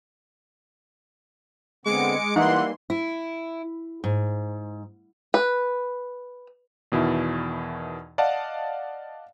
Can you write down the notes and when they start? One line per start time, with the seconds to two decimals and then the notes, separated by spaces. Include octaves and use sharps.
1.86 D3 G#3 B3 C4 D6 C#7 D7
2.36 E3 G3 A#3 D#4 F#5 C6
2.90 E4
4.04 G#2
5.34 B4
6.92 E2 B2 D#3 E4
8.18 D5 D#5 F5 F#5 A5